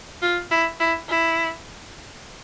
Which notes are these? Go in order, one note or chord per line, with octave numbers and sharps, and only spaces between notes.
F4
E4
E4
E4